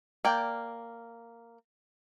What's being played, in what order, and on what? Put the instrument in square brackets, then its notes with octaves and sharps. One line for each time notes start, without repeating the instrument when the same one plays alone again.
[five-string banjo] A#3 D5 G5